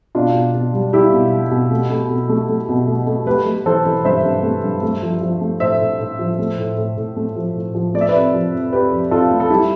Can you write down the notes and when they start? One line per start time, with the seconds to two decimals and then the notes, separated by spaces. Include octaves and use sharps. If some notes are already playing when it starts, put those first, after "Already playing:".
0.15 B2 D4 F4
0.34 B2
0.54 B2
0.73 G3
0.92 G3 E4 G4
1.12 B2
1.32 G3
1.51 B2
1.71 A3
1.90 A3
2.10 B2
2.29 A3
2.49 A3
2.69 B2
2.87 A3
3.07 A3
3.26 A3 G4 B4
3.46 A3
3.66 E3 A4 C5
3.85 E3
4.05 G2 C5 E5
4.24 G2
4.43 A3
4.64 G2
4.83 A3
5.02 F3
5.21 F3
5.41 A3
5.60 A2 C5 E5
5.80 A2
5.99 A2
6.19 F3
6.39 A3
6.58 A2
6.78 A2
6.97 A2
7.17 A3
7.36 F3
7.55 A2
7.75 F3
7.94 A3 D5
8.01 E5
8.09 B4 D5
8.14 C3
8.34 F3
8.53 F2
8.73 C3 G4 B4
8.92 F2
9.11 C3 F4 A4
9.31 A3
9.40 A4
9.50 G3 E4 G4